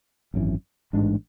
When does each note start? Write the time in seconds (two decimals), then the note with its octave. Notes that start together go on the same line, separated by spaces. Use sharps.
0.34 G#1 F#2 E3
0.93 A1 G#2 G#3 D4